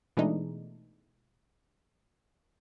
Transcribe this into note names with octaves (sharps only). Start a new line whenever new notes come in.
B2 E3 G#3 A3 D4 D#4